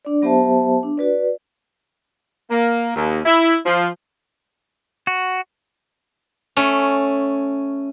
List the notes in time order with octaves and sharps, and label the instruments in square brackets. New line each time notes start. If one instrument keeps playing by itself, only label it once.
[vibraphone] D4 D5
F#3 B3 G4 C5 E5 A5
D4
F#4 B4 D5
[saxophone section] A#3
D#2
E4
F3
[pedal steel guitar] F#4
[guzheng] A3 C#4